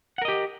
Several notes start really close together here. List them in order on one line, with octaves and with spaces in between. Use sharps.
F#5 A#4 D#5 G4